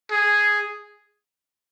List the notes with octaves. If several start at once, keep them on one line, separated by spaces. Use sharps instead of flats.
G#4